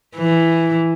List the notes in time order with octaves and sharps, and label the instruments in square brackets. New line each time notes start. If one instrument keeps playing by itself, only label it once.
[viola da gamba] E3